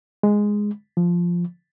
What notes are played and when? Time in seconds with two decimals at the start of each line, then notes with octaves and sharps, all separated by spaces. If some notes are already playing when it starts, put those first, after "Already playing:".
0.23 G#3
0.97 F3